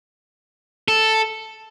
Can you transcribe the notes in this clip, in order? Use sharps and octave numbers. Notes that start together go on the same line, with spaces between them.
A4